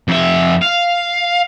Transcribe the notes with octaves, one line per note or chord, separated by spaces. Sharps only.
F2 E5
F5